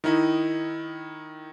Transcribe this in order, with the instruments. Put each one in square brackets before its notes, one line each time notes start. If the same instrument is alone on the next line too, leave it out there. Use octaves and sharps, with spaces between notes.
[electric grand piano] D#3 D#4 E4